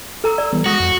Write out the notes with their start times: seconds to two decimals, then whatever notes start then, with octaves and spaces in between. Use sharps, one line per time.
0.24 A4 A#5 E6
0.38 D5
0.53 E3 G3 B3
0.66 G#3 F#4 D#6 A#6
0.80 F2